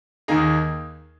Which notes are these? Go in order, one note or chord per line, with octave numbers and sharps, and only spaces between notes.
D#2 D#3 A#3 D#4 G#4